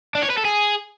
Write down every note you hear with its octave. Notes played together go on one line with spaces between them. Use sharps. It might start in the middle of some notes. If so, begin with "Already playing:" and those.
D4
C#5
B4
A4
G#4